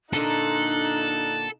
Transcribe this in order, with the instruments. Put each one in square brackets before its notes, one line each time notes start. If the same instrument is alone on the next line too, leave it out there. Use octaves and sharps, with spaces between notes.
[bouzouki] A#2 D3 A#3 [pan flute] D4 [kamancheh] D#4 F#6 [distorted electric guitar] A4